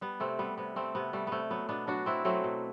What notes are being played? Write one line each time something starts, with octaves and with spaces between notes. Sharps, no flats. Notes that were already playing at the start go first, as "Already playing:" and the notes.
G3 B3
C3 A3 C4
G3 B3
C3 B3
G3 A3 C4
C3 B3
G3 A3
C3 A3 B3
F#3 B3
B2 B3 D4
F#3 D4 F#4
B2 C4 E4
F#3 A3 C4
B2